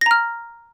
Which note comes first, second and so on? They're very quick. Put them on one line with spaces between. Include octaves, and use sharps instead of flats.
A#6 A#5 F6